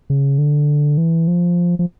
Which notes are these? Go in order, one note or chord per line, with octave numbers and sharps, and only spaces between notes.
C#3
D3
E3
F3
F3